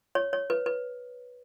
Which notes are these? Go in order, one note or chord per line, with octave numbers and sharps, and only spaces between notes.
C#5
C#5
B4
B4